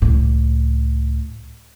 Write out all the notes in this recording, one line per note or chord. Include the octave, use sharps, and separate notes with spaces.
C#2 A2